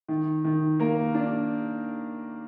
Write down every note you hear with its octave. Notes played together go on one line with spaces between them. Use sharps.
D#3
D#3
A#3 A#4
D4